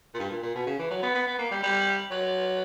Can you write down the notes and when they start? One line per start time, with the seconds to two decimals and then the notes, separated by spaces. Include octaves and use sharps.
0.14 A#2
0.19 G2
0.30 A#2
0.42 A#2
0.55 B2
0.66 C#3
0.79 E3
0.90 F#3
1.02 B3
1.15 B3
1.27 B3
1.38 A#3
1.51 G3
1.63 G3
2.11 F#3